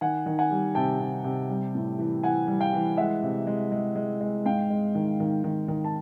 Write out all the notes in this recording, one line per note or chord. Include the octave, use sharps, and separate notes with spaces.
D#3 F#5 G#5
D#3
F#5 G#5
G3
C3 G5 A5
C3
C3
G3
A2
E3
E3 F#5 G#5
G3
F5 G5
E3
G#3 E5 F#5
C3
G#3
G#3
G#3
G#3
G#2 F5 G5
G#3
D#3
D#3
D#3
D#3
A5